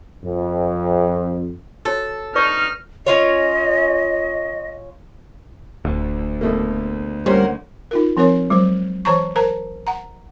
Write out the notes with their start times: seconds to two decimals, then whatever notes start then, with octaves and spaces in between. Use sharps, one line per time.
0.25 F2
1.85 F#4 A4 C#5
2.35 D#4 B4 D5 C#6 F6
3.07 C#4 F4 C#5 D#5
5.85 D1 D2
6.41 B2 A3 A#3
7.26 G3 A#3 C#4 A#4 C5 F#5
7.91 D#4 F4 A#4
8.17 F3 C4 A#4 C#5
8.50 F#3 G#3 C5
9.05 E3 C5 C#5 A5 A#5 C#6
9.36 A#4 C5 A5 A#5
9.87 F#5 A#5